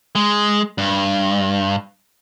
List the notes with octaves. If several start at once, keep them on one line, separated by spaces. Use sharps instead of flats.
G#3
G2